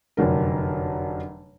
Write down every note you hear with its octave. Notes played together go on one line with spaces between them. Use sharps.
F1 F#2 D3 A#4